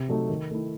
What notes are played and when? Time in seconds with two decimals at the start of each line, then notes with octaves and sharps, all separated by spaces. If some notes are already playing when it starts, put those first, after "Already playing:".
Already playing: C3
0.08 F#3 A3 D#4 A4
0.29 D#3
0.51 A3 E4